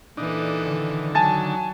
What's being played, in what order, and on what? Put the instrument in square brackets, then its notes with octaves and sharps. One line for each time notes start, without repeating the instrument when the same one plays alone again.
[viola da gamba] A#2 E3 A4 [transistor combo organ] D4 D#4
[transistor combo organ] D3 D#3
[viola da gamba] F#3 [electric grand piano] G#5 A5 A6